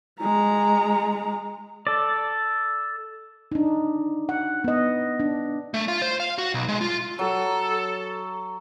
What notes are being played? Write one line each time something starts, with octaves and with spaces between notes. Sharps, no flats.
G#3 A#5
A4 D5
D4 D#4
F#5
B3 D#5
D4
A3
F4
C5
F5
F#4
B1
G#3
F4
F#3 A4